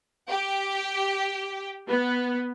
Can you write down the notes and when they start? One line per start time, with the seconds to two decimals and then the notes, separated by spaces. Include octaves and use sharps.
0.30 G4
1.88 B3